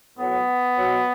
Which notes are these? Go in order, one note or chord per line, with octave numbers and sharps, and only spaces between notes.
A2 F#3 B3
B2 F#3